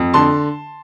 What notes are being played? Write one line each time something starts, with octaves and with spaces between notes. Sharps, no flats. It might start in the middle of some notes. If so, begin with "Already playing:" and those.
Already playing: F2
D3 A5 C6